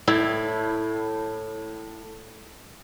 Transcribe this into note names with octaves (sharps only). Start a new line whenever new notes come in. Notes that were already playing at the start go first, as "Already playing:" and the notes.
A2 E4